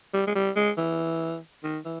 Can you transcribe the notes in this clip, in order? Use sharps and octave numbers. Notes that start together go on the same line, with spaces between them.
G3
G#3
G3
G#3
E3
D#3
E3